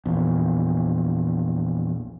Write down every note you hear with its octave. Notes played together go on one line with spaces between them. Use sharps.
A#1 E2